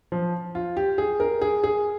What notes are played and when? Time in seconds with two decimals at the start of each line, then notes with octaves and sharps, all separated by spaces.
0.12 F3
0.55 F4
0.77 G4
0.98 G#4
1.20 A#4
1.42 G#4
1.64 G#4